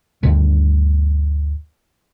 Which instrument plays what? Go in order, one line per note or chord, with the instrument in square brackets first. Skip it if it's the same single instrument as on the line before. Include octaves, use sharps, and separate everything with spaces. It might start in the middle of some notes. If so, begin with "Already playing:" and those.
[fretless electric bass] D2 G2 D3 D#3